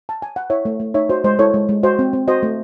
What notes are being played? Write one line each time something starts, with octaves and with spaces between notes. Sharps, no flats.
A5
G#5
F#5
E4 C#5 E5
A3
A3
D#4 C#5 E5
F#4 C5 D#5
G#3 C5 D#5
E4 A4 C#5
G#3
G#3
F#4 C5 D#5
C4
C4
F#4 C5 D#5
A3